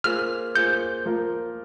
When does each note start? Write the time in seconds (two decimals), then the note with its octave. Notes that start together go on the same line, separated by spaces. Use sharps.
0.04 A#3 F4 G#4 C5 F6
0.55 A#3 F4 G#4 C5 G6
1.05 F3 A#3 F4 A#4